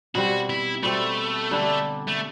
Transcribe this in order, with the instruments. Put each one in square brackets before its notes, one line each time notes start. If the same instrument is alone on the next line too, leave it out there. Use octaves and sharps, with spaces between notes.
[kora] B2 G3 C4 [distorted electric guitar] F#4
[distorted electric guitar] E4
[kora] B2 G3 C4 [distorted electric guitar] A3
[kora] D3 G3 D4
[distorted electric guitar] A3